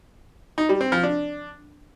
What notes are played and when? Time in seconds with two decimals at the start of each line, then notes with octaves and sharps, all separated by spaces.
0.58 D#4
0.69 G3
0.81 C4
0.92 F3
1.03 D4